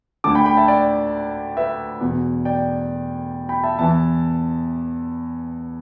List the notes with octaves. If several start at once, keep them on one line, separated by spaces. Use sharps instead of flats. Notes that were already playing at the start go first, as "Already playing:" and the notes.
D2 D3 A5 D6
G5 B5
G5 B5
E5 A5
D5 G5
B4 E5
E2 B2
D5 G5
G5 B5
E5 A5
E2 E3 E5 A5